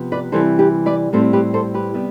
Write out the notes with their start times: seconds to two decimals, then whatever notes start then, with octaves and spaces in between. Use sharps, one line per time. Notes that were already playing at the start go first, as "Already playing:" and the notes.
Already playing: C3 F3 B3
0.12 B4 D5
0.32 C3 E3 G3 A4 C5
0.59 G4 B4
0.86 B4 D5
1.13 A2 G3 C4 A4 C5
1.33 G4 B4
1.54 A4 C5
1.74 G4 B4
1.94 C3 G3 B3